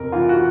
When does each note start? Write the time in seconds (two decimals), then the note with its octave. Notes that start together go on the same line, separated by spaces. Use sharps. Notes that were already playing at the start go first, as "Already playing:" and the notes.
Already playing: F2 C3 A#4
0.12 E3 F4
0.29 F#4
0.36 E3